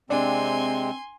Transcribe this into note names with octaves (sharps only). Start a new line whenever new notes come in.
C3 G#3 C4 D4 G#5 C6